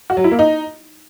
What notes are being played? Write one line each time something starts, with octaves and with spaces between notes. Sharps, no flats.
F#4
F#3
E4
A#3
D#4